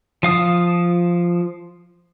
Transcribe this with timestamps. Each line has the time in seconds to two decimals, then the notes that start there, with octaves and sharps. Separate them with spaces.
0.23 F3 F5 D#6